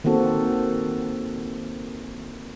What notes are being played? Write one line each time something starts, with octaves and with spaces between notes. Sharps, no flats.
D#3 A#3 C4 F#4 A4